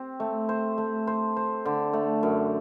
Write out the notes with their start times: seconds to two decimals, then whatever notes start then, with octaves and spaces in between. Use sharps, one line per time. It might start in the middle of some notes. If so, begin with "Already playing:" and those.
Already playing: C4 G4
0.20 A3
0.49 C5
0.78 A3
1.07 C5
1.37 C5
1.65 D3
1.93 A3
2.23 F#2